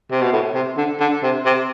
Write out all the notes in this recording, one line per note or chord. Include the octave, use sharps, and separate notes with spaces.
C3
B2
A2
C3
D3
D3
C3
C3